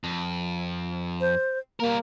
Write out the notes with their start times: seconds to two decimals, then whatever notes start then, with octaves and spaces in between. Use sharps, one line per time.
0.04 F2
1.21 C5
1.80 G3 A#3 A#4